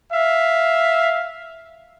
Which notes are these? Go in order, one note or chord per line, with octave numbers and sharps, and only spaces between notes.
E5 F5